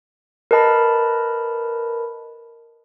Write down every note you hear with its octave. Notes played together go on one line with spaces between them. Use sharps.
A#4 B4 D#5 A5 B5